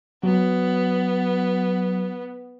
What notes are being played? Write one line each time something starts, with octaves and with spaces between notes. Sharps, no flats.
F#3 B3